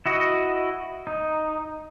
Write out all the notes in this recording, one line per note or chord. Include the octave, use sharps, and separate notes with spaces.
E4 F#4 D#5
D#4